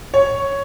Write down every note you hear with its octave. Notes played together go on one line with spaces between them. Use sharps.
C#5